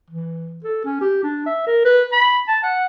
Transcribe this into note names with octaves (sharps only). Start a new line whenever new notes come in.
E3
A4
C#4
G4
D4
E5
A#4
B4
B5
A5
F#5